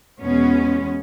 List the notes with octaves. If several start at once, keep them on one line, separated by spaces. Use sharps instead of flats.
E2 B2 G#3 B3 C#4